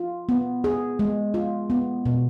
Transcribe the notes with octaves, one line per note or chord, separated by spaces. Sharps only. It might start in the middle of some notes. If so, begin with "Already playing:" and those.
Already playing: F4
B3
G#4
G#3
F4
B3
B2